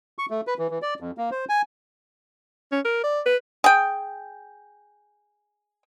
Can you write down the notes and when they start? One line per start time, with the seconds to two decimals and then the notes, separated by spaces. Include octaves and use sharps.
0.18 C#6
0.30 A3
0.47 B4
0.59 E3
0.70 E3
0.82 D5
1.00 F2
1.18 A#3
1.31 C5
1.49 G#5
2.72 C#4
2.85 A#4
3.04 D5
3.26 B4
3.64 G#4 G5